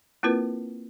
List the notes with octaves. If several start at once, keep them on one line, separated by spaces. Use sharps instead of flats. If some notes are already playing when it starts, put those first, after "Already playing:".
A#3 C4 E4 F4 A#4 B4